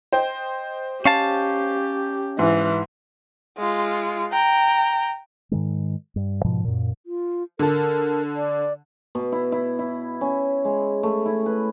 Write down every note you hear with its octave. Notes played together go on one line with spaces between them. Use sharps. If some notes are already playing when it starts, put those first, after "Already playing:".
C5 D#5 G5
C#4 G4 F5 A5
G#2 E3
G#3 F4
G5 A#5
G#2 D#3 G#3
G2
G#2 B2 F3
F#2 A#2
F4
D3 A4 A#4
D5
B2
E4
E4
E4
C#4
G#3
A3
E4
B4